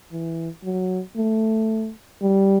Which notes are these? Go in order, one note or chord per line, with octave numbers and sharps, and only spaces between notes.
E3
F#3
A3
G3